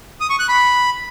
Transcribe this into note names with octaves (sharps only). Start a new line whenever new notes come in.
D#6
C#6
F#6
B5